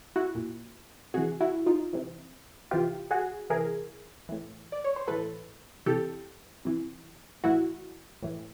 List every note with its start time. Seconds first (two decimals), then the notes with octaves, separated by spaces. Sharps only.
0.16 E4 F#4
0.35 A#2
1.14 C3 E3 F#4 G#4
1.40 E4 F#4
1.66 D#4 F4
1.93 C3 E3
2.71 C3 E3 F4 G4
3.11 F#4 G#4
3.50 C3 E3 G#4 A#4
4.29 A2 E3
4.72 D5
4.84 C#5
4.96 C5
5.08 A2 E3 A4 B4
5.86 C3 E3 G4 A4
6.65 C3 E3
7.44 A2 E3 E4 F#4
8.23 A2 E3